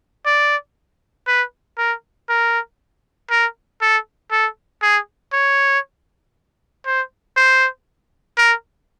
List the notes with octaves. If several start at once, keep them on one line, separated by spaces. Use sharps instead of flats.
D5
B4
A#4
A#4
A#4
A4
A4
G#4
C#5
C5
C5
A#4